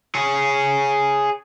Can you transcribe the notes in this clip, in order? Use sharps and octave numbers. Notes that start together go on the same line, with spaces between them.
G#4 C#5